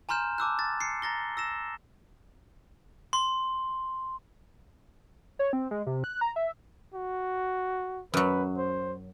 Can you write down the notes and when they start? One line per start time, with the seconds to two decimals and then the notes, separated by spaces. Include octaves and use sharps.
0.09 G#5 A#5 C6 F6 G6 E7
0.38 A5 D6 E6 F#6
0.59 A6
0.81 C7 C#7
1.02 A#5 A6 A#6 G7
1.37 E6 A#6 E7
3.13 C6
5.39 C#5
5.53 C4
5.71 G#3
5.87 C3
6.04 F#6
6.21 A#5
6.36 E5
6.95 F#4
8.14 F#2 F#3 B4
8.58 C5